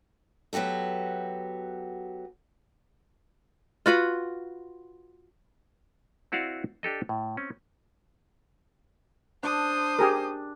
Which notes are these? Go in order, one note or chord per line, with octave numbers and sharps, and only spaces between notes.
F#3 B3 F#4 G4 A4
F4 F#4 B4 F#5
C4 E4 F#4 D5 F5 F#5
D4 G4 A4 D#5
A2
C4 C#4
D4 C5 A5 D#6
G4 G#4 A#4